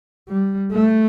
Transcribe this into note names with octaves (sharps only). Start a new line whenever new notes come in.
G3
A3